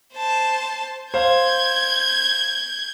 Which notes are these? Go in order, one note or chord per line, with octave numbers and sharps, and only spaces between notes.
C5 A5
C5 F5 G6 G#6